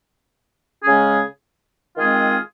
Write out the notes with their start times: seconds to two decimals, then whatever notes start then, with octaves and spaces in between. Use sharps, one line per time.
0.83 C#3 G#3 C#4 G#4
1.97 D#3 G#3 C4 F4 G#4